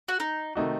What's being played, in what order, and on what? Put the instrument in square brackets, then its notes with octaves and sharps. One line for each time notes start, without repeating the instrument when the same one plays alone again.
[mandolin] F#4
D#4
[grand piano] C3 D#3 A3 D#4 F#4